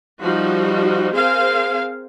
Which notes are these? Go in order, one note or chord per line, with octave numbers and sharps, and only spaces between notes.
F3 G3 D#4 F#4
C4 G#4 A#4 C5 F5